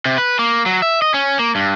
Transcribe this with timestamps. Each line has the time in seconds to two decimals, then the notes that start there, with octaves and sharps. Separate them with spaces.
0.06 C3
0.18 B4
0.39 A#3
0.66 F#3
0.82 E5
1.02 D#5
1.14 C#4
1.39 A#3
1.55 G2